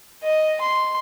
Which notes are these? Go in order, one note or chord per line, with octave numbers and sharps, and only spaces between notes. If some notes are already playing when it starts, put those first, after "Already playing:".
D#5
C6